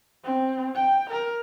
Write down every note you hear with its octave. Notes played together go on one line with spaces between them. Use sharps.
C4
G5
A#4